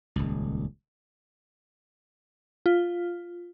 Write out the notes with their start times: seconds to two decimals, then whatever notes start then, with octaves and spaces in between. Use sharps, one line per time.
0.16 D#1 C#2
2.66 F4